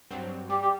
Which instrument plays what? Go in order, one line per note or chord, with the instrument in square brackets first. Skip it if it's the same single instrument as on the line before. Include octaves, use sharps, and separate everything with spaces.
[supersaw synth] G2 F#3 C4
[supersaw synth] G3 [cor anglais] G4
[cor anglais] G4